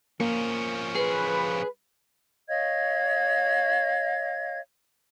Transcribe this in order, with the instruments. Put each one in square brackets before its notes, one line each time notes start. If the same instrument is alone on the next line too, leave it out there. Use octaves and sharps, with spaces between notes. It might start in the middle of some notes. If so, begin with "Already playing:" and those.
[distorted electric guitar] F3 C#4 [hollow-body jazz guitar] A#3
[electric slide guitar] G#4 [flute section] B4
[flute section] C#5 D#5 F5 G#6